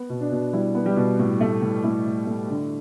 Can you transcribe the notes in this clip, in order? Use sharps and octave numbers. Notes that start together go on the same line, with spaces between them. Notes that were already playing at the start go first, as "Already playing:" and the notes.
Already playing: B3
B2
D4
B2
G3 E4
B3
G3 G4
B2
A2
A3
A2
A3 E4
A2
A3
D3